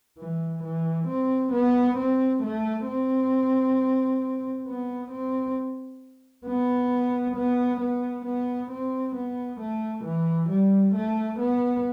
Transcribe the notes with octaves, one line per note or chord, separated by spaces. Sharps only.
E3
E3
C4
B3
C4
A3
C4
B3
C4
B3
B3
B3
B3
C4
B3
A3
E3
G3
A3
B3